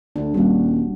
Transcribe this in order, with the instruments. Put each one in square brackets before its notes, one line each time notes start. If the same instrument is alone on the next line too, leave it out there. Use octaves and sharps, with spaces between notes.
[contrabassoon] D2 [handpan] D4
[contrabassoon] D#1 [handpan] G3 F#4